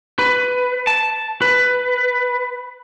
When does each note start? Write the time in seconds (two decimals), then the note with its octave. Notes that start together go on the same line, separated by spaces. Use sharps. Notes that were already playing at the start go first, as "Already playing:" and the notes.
0.19 B4
0.87 A5
1.42 B4